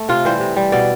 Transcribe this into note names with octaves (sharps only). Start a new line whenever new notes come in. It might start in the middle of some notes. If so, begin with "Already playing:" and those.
Already playing: A3
C3 F4
E3 G3 C5
C3
G3
B2 D5